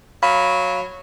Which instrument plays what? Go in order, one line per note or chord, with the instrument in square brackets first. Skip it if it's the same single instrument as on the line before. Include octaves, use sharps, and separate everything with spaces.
[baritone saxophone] F#3 [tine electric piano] F5 B5